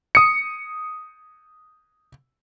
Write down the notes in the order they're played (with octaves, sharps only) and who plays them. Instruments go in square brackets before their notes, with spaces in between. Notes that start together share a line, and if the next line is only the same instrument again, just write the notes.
[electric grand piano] D#6 C#7